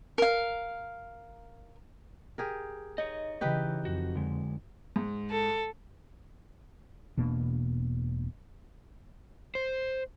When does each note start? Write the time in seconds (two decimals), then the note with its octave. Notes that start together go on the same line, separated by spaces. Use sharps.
0.18 A#4 F5
2.38 G4 G#4 A#4
2.98 D#4 C#5 D#5
3.41 C#3 E3 D#4 G4 B4
3.85 F2 F#4
4.15 D3 G#3
4.96 G#2
5.30 A4
7.17 E1 B2 A#3 D4
9.55 C5